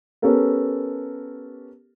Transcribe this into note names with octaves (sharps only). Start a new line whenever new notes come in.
B3 C#4 G4 A4 A#4